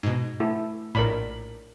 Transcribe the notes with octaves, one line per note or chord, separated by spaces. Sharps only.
G#2 B2
A3 E4 A4
A#1 A2 A#4 D5 B5